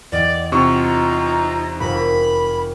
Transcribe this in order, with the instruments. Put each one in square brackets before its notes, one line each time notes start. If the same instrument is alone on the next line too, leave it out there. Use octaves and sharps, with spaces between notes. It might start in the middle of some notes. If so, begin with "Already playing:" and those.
[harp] E2 D#5 G5 [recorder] D5
[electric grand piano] C3 C#6 [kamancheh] D#4 A#5 [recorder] F4
[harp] F1 F2 A#4 [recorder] B5